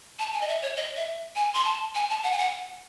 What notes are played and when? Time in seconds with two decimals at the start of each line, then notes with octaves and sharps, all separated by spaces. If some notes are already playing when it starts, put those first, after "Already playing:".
0.19 A5
0.33 G#5
0.41 D#5
0.48 E5
0.62 C#5
0.77 D#5
0.96 E5
1.36 G#5
1.54 C6
1.65 A5
1.95 G#5
2.10 A5
2.24 F#5
2.32 G#5
2.38 F#5